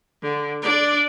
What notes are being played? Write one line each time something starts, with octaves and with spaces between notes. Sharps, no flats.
D3
D4 D5